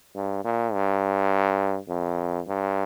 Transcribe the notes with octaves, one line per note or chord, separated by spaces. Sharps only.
G2
A#2
G2
F2
G2